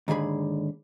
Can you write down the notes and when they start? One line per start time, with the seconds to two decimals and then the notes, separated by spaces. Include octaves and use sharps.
0.08 D#2 G#2 D3 G#4 B5